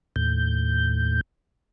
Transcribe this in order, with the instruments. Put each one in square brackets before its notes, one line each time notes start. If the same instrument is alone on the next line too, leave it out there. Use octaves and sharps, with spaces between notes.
[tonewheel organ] D#2 A2 G6